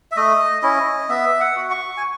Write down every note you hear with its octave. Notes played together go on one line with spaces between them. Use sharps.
E5
A3 D#5
C#4 E4 D#5
B3 E5
F#5
F#4
C#6
G#5